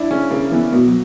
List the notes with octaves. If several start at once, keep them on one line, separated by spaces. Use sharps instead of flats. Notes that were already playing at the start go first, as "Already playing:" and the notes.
Already playing: D4 E4
C#3 C#4
C#3 A#3
E3 B3
B2 A#3
F#3